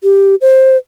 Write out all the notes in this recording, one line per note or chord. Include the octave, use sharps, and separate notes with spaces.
G4
C5